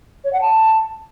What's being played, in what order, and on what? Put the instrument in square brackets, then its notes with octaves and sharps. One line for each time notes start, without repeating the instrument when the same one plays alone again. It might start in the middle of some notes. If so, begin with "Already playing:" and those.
[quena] C#5
F#5
A5